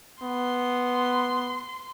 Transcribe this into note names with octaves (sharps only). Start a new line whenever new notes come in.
B3 C6